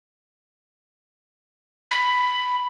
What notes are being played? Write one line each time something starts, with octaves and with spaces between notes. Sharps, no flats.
B5